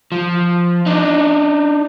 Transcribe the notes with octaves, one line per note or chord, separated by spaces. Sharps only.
F3
D4 D#4